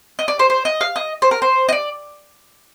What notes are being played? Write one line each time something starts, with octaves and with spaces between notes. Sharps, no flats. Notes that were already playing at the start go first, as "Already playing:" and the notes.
D#5
D5
C5
C5
D#5
F5
D#5
C5
A#4
C5
D#5
D5